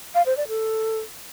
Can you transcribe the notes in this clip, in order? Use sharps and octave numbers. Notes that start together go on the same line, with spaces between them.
F5
C5
D5
A4